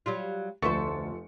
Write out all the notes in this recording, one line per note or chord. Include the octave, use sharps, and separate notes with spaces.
F#3 G3 F4
F1 D2 F3 A4 B4 C5 C#6 C#7